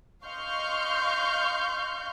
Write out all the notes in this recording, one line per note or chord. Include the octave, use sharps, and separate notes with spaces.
D#5 F5 C6 C#6 F6 G6